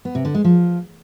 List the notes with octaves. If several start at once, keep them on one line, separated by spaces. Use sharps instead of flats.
B3
C3
D3
G#3
F3